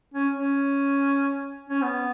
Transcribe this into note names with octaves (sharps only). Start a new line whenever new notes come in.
C#4
C#4
C#4
B3